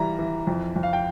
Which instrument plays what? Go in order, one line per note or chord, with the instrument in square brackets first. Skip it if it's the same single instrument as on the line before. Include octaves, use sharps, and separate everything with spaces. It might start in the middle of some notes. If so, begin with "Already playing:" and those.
Already playing: [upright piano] E3 G3 A#5
E3
F2
F2
F5
G5